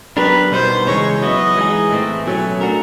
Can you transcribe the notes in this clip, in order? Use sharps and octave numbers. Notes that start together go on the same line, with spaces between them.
F#3 B3 D4 G4 A#4 B4
B2 G3 B3 D#4 C5
C#3 E3 G#3 C#4 C#5
F#3 B3 E4 D#5
E3 G#3 B3 D#4 G#4
A2 E3 A3 C4
B2 F#3 A3 C#4 G#5
A3 D4 F#4 A#4